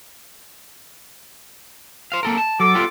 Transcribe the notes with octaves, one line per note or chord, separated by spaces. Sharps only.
C5 F5
A#3 A4 A#4
A5
F#3 A4 D6
G3 B3 F4